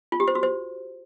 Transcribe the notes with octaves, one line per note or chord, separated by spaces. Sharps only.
F4
G4
C5
F#4
C5